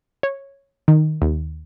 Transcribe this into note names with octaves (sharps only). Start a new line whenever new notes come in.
C#5
D#3
D#2